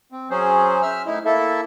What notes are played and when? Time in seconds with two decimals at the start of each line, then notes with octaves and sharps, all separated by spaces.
0.12 C4
0.30 F#3 C#4 G#4 C5
0.82 E5 E6 F6
1.06 A2 D#4 E4
1.25 A#3 E4 A4 E5